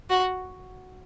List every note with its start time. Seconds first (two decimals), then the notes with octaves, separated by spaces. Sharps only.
0.10 F#4